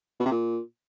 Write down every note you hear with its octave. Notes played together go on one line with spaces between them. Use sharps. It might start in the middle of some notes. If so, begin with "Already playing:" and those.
B2
C3
A#2